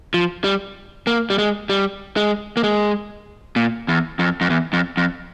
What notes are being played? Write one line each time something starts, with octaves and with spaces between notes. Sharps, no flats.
F3
G3
A#3
G3
G#3
G3
G#3
A#3
G#3
A#2
E2
F2
F2
E2
F2
F2